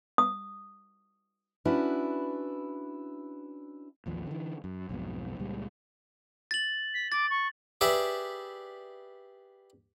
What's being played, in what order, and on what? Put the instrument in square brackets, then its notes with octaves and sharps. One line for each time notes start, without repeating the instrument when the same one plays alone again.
[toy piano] D#6
[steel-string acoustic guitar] C#4 D4 E4 F#4 B4
[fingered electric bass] A1 D#2 F3
D3 E3
F#2
B1 F2 G#2 B2
C#2 A#2 G3 G#3
[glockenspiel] A6 F#7
[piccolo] B6
[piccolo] D6 [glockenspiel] A6
[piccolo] C#6
[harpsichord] G4 G#4 B4 D5 E5